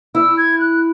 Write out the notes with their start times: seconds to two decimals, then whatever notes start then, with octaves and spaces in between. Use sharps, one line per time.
0.15 E4 E6
0.37 G#6
0.59 F#6